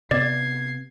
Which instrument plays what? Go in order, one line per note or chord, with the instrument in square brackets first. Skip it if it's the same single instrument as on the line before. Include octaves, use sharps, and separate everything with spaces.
[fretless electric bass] C3 B3 [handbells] D5 [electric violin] G#6 C7